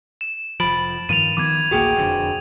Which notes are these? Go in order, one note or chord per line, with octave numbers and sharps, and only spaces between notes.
E7
F1 F3 B5 A6 D7 F#7
G2 D#3 F3 D#7 F7
D#3 F3 B3 D6 G#6
A1 D2 A#3 F#4 G#4 G5
E1 F2 D3